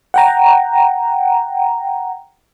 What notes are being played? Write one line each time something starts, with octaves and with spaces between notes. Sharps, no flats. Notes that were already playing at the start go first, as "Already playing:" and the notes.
F#5 G5 A#5